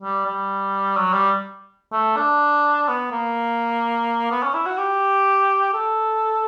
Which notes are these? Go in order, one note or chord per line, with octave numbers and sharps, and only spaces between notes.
G3
G3
F#3
G3
A3
D4
B3
A#3
B3
C#4
E4
F#4
G4
A4